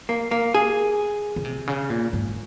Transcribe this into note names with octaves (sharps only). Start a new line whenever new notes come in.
A#3
A#3
G#4
C#3
C3
C#3
A#2
G#2